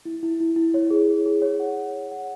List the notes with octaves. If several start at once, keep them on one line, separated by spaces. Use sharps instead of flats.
E4
E4
E4
E4
C#5
G#4
G#4
G#4
C#5
F#5
C#5
G#4
F#5